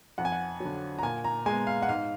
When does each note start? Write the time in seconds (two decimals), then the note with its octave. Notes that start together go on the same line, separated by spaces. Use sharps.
0.18 F2 F#5
0.25 G#5
0.32 F#5
0.60 D3 F#3
0.99 A#5
1.03 A#2 G#5
1.24 A#5
1.46 G#3 B3 G#5
1.67 F5
1.82 F#5
1.88 G#2 F5